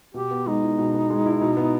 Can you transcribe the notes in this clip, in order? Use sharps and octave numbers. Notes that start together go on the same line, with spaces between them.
B2 G4
B3
G#3 D#4
E4
B2
B3
G#3
E4
B2
B3